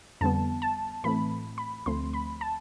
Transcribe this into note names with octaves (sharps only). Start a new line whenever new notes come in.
F2 D3 G3 B3 A5
A5
A2 E3 A3 C4 B5
B5
D2 D3 F3 A3 C4 C6
B5
A5